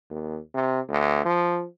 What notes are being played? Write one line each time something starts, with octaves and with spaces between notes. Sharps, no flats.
D#2
C3
D2
F3